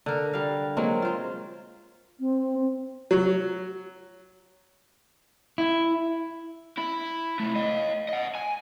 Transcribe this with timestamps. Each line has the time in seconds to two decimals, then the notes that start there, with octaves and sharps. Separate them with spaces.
0.06 D3 A#4
0.33 G3 F5
0.77 F#3 G#3 A#3 C4
1.02 F4 C5
2.20 C4
3.11 F#3
5.58 E4
6.78 E4
7.39 C3 A3
7.55 D#5 F5
8.09 D#5 F#5
8.35 G#5